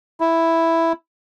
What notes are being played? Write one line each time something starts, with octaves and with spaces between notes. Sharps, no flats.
E4